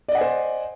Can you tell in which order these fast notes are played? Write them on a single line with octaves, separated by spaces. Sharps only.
D5 D#5 F#5 G#5 C5